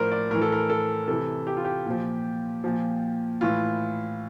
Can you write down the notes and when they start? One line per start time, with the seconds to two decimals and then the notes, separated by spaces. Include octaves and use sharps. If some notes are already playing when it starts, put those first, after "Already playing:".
Already playing: A2 F3 A#4 C5 D5
0.11 D5
0.30 A2 E3 A#4
0.41 A4
0.52 A#4
0.70 A4
1.08 C3 E3 A4
1.47 G4
1.57 F4
1.65 G4
1.86 A#2 F3
2.64 A#2 F3
3.41 A2 E3 F4